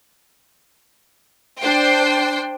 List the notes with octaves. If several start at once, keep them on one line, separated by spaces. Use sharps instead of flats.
D4 C5 G5 C7